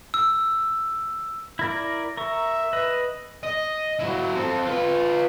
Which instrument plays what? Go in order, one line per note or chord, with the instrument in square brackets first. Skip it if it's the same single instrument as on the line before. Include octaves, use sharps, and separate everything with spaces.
[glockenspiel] E6
[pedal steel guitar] E4 A#4 D5
[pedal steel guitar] A#4 C#6 [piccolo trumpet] E5
[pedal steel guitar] B4 D#5
[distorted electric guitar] D#5
F#3 E4
C4 A4
F4 B4